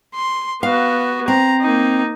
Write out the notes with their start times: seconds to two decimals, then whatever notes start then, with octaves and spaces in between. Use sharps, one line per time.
0.15 C6
0.63 B3 F#4 F5
1.28 C4 A#5
1.61 A#3 D#4